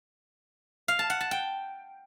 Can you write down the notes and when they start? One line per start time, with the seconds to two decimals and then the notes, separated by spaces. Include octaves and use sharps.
0.88 F5
0.99 A5
1.10 F#5
1.21 A5
1.31 G5